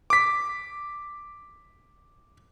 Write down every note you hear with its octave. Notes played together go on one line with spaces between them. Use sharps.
D6 B6